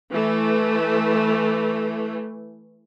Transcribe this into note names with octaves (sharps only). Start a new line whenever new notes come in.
E3 A3